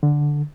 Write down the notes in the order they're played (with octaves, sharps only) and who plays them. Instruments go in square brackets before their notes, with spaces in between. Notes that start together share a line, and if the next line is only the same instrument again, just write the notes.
[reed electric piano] D3